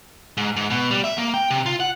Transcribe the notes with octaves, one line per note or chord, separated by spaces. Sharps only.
G#2
G#2
B2
G3
E5
A#3
G5
C3
F4
F#5